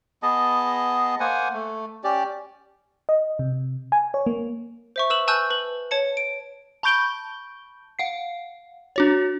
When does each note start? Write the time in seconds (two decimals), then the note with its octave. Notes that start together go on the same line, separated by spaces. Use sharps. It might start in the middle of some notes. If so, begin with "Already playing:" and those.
0.23 B3 G#4 D#5 A5
1.20 A#3 C5 F#5 G#5
1.54 A3
2.04 C#4 G4 D5
3.09 D#5
3.39 C3
3.92 G#5
4.14 C#5
4.26 A#3
4.96 C5 E5 C#6
5.10 B4 E6 E7 F#7
5.28 G#5 A5 C#6 E6 F#6 G6
5.50 B4 F#7
5.91 C#5 A5 C#7
6.17 D7
6.83 A5 B5 C#6 G6 D7 G7
7.99 F5 F#5 C7
8.96 D4 F#4 C#5